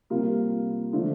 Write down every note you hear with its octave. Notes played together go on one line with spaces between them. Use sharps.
C3 G3 A#3 F4
D3 F3 A3 D4 F4